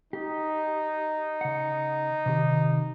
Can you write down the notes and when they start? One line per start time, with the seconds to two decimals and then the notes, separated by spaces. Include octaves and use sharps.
0.13 D#4 G4
1.41 C#3 F#5
2.26 C3 D#3 G4